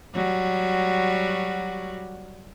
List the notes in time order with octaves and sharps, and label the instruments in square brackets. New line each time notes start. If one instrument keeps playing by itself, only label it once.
[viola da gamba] F#3 G3 F#4